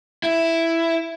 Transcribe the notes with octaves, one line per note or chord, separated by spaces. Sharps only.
E4